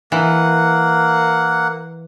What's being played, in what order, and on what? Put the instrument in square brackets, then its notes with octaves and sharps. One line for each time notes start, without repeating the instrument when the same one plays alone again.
[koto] E3 [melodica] A#3 F#5